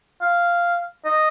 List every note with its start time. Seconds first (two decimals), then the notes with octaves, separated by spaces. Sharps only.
0.22 F5
1.05 D#5